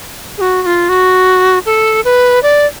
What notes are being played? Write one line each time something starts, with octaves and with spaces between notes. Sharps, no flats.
G#4
F#4
F#4
F4
F#4
A4
B4
D5